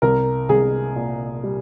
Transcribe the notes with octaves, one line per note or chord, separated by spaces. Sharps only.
C2 A#4
C2 G#4
A#2
G3